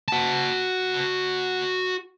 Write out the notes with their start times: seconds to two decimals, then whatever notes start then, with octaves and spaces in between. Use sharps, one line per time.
0.08 F#4 A5